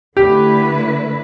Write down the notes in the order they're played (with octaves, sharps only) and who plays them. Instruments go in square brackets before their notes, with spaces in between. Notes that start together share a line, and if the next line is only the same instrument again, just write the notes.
[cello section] D3 A3 E4 B4 [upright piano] G4